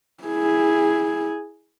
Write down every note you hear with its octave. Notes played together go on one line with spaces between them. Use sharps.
E4 G#4